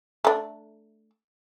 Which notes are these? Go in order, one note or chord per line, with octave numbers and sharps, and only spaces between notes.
A3 D4